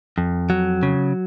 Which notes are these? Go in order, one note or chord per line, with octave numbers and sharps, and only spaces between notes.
F2
F#3
C#3